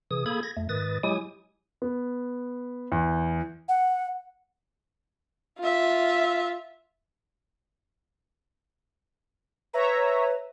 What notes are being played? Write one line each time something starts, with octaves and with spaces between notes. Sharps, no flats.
C3 E3 G#4 D#6
A#3 G#4 A4 B5 D#6 G#6
G#6 A#6
F2 A3
G#2 D#3 B4 D#6 A6
F#3 G#3 E4 G4 G#5 D#6
B3
E2
F#5
F4 E5
B4 C#5 E5 A#5